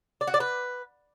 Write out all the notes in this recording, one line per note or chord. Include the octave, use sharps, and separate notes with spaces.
D5
F#4
D5
B4